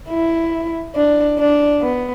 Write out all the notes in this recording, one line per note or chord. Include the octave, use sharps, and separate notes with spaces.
E4
D4
D4
B3